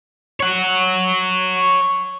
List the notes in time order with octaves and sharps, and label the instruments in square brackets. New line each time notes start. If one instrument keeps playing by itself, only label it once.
[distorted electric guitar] C#5 F#5